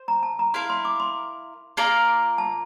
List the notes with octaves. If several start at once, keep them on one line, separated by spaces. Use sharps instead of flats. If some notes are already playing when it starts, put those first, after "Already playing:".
Already playing: C5
A#5
A5
A#5
E4 A#4 F5 C6
C6
D6
C6
A#3 F4 A#4 D5
A5